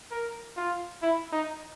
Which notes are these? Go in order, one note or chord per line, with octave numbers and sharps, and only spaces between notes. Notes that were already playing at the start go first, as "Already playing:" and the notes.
A#4
F4
E4
D#4